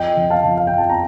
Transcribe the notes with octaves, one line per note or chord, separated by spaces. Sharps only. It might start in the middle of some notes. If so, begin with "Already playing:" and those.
Already playing: F2 D#5 G5
F3
F5 A5
F3
F5
G5
F2
A5
A#5